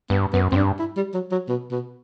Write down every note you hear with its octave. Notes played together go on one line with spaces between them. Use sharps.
G2 B3
F#2 B3
F#2 C4
G2 D4
E4
G3
F#3
F#3
B2
B2